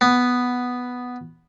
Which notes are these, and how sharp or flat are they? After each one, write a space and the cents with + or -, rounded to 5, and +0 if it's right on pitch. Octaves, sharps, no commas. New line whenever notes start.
B3 +0